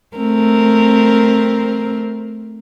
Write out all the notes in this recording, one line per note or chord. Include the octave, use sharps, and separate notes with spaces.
A3 C4 A#4